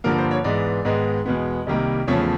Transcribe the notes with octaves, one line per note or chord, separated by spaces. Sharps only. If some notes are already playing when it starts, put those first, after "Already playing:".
G2 D3 F3 A#3 A#4
C5
C#5
G#2 E3 G#3 B3 D5
G#2 D#3 G#3 B3
E2 B2 G#3 B3
C2 C3 D#3 G3 A#3
E2 C#3 F3 A3 C#5